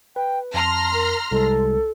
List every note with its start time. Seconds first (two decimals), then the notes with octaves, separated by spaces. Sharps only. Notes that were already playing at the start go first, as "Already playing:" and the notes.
0.16 B4 G5
0.54 F2 A5 A#5 C6 F6
0.94 A#4
1.32 C2 G#3 A4